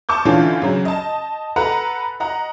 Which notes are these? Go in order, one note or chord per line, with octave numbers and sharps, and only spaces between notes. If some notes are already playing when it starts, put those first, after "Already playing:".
A5 C#6 D6 G6
D3 E3 C#4 F4
C#3 F#3
D#5 A5
A4 B4 F#5 A#5
D#5 F#5 A#5